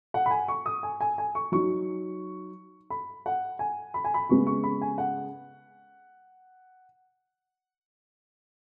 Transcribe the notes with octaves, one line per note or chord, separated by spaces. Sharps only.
F#5
B5
G#5
C#6
D#6
G#5
G#5
G#5
C#6
F#3 D#4 C#6
B5
F#5
G#5
B5
G#5
B5
C#3 G#3 B3 C#6
C#6
B5
G#5
F#5